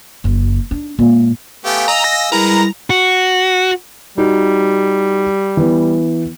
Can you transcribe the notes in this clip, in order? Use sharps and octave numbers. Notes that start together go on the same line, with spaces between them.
F#1 F#2
D4 D#4
A#2 G#3
A3 B3 G4 F5 G#5
D#5 A#5 E6
A#6
G3 G#3 E4 A#4 B4 A#5
F#4
G3 D#4 F#4
E3 B3